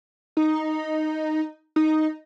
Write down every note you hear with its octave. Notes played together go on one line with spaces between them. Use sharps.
D#4
D#4